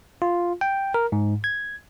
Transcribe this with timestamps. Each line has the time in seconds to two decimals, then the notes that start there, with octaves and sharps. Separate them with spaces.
0.22 F4
0.61 G5
0.94 A#4
1.12 G#2
1.44 G#6